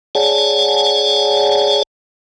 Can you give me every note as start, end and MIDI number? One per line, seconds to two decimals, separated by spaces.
0.15 1.83 68
0.15 1.83 73
0.15 1.83 74
0.15 1.83 78
0.15 1.83 80
0.15 1.83 81